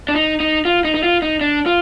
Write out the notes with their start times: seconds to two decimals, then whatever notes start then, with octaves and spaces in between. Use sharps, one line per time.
0.09 D4
0.15 D#4
0.40 D#4
0.65 F4
0.85 D#4
0.95 D#4
1.03 F4
1.22 D#4
1.41 D4
1.66 F4